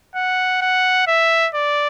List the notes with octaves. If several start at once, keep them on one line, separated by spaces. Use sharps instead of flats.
F#5
F#5
E5
D5